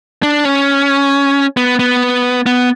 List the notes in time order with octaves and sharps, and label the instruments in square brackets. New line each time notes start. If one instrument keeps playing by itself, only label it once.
[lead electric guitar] D4
C#4
B3
B3
B3